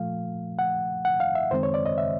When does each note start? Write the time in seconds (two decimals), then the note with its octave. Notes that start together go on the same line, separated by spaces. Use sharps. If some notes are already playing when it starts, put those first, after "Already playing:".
Already playing: A#2 F3 A3 F5
0.59 F#5
1.05 F#5
1.20 F5
1.35 E5
1.51 F#2 D#3 G#3 C4 C5
1.63 C#5
1.74 D5
1.86 D#5
1.98 E5